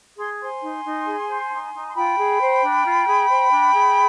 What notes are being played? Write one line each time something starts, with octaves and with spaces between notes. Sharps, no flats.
G#4 C6
C5 G#5 C6
D#4
D#4
G#4
C5
D#4
D#4
C6
F4 G5 B5
G#4
C5
D4
F4
G#4
C5
D4
G#4